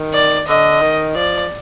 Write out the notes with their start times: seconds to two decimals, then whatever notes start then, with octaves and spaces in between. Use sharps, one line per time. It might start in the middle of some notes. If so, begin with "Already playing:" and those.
Already playing: D#3
0.14 D5
0.48 D3 D#5
0.82 D#3
1.15 F3 D5